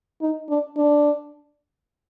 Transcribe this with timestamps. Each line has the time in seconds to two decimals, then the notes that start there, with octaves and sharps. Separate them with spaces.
0.21 D#4
0.49 D4
0.77 D4